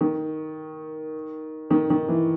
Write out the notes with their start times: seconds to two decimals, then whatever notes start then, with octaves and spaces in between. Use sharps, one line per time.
0.01 D#3
1.71 D#3
1.90 D#3
2.09 E3